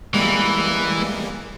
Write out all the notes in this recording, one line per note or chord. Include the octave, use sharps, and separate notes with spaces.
E3 G3 G#3 A#3